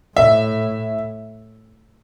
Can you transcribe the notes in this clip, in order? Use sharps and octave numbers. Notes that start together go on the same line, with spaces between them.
A2 E5